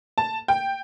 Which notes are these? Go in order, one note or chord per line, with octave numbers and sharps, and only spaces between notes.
A5
G5